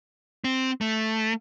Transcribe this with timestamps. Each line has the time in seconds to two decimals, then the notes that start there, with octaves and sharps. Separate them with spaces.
0.44 C4
0.81 A3